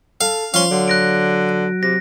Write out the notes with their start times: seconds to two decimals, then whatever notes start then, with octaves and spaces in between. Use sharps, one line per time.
0.21 A4 F5
0.54 F3 C#4 F5 C6
0.71 D3 F#3
0.88 F#6 A#6 D7
1.83 C3 A#6